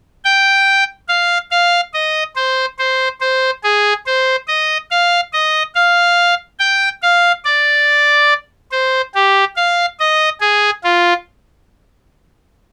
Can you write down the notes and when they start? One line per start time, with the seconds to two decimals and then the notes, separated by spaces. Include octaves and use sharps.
0.25 G5
1.09 F5
1.51 F5
1.93 D#5
2.36 C5
2.79 C5
3.21 C5
3.64 G#4
4.06 C5
4.48 D#5
4.91 F5
5.33 D#5
5.75 F5
6.59 G5
7.03 F5
7.45 D5
8.72 C5
9.15 G4
9.56 F5
9.99 D#5
10.41 G#4
10.84 F4